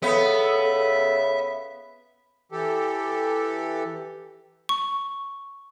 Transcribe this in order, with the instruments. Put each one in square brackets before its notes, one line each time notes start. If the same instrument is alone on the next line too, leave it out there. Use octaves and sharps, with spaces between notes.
[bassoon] C#3 [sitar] B3 [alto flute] A4 [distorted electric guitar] E5
[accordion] E3 G4 A4
[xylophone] C#6